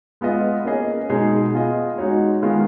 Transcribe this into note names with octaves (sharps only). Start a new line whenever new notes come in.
G#3 B3 F4 B4 D#5
A#3 C#4 G#4 D#5
B2 G#3 D#4 G#4
B3 F4 G#4 D#5
G#3 D#4 F#4 C#5
D#3 G#3 B3 F4